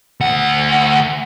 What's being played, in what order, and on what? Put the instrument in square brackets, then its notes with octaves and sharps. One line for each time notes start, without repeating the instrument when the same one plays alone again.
[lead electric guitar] D2 F#5